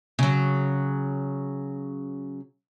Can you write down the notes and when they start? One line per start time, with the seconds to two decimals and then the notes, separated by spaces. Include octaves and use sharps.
0.19 C#3 F#3